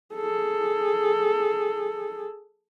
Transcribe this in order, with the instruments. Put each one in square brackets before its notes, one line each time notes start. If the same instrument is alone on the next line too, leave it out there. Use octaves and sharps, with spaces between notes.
[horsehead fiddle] G#4 A4